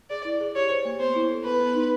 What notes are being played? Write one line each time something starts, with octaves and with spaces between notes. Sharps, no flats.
G#4 D5
E4
G#4
G4 C#5
C5
A#3
B3 C5
E4
A4
B3 B4
B3
D#4